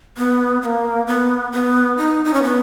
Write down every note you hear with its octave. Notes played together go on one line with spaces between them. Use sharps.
B3
B3
A#3
B3
B3
D#4
D#4
C#4
B3